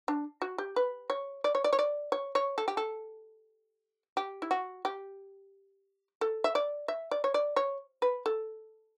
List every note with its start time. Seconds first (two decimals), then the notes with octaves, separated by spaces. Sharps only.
0.08 D4
0.42 F#4
0.58 G4
0.76 B4
1.10 C#5
1.44 D5
1.55 C#5
1.64 D5
1.73 C#5
1.79 D5
2.12 C#5
2.35 C#5
2.58 A4
2.68 G4
2.77 A4
4.17 G4
4.42 E4
4.51 F#4
4.85 G4
6.21 A4
6.44 E5
6.55 D5
6.88 E5
7.11 D5
7.24 C#5
7.34 D5
7.56 C#5
8.02 B4
8.26 A4